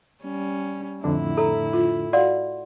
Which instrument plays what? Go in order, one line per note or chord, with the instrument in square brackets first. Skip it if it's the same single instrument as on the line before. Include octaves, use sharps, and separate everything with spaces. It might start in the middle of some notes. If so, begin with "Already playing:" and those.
[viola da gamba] G3 C#4
[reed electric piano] F2 D3 D4 [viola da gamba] A2 E4
[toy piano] A4 [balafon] A#5
[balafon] F4
[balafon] F#4 F5 [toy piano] D5 F#5 C6